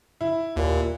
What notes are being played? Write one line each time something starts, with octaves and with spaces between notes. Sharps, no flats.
E4
D#2 A#2